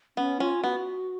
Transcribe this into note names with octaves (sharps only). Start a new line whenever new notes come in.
B3 C#4
C#4 F4
B3 F#4